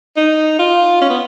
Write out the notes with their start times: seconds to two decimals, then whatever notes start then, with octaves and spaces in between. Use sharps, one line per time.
0.17 D#4
0.59 F4
1.01 C#4
1.09 B3